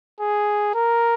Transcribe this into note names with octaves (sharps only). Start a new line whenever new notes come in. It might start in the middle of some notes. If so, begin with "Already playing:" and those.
G#4
A#4